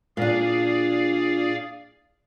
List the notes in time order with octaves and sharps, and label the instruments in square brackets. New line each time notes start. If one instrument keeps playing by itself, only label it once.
[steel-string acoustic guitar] A#2 D4 [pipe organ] G#4 D5 F5